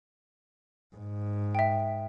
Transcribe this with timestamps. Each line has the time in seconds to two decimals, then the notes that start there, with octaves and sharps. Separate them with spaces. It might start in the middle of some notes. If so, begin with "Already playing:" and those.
0.96 G#2
1.55 E5 G5